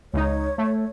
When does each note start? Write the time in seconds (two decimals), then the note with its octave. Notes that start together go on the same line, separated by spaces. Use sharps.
0.14 C#2 D#4 C#5
0.58 A3